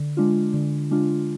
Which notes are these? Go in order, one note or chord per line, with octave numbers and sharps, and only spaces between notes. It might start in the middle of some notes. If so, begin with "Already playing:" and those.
Already playing: D3
G#3 D4 F4
D3
G#3 D4 F4